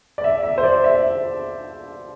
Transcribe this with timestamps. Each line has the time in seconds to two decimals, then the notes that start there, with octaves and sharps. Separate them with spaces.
0.18 D5
0.24 E5
0.43 E5
0.58 C5
0.64 D5
0.84 E5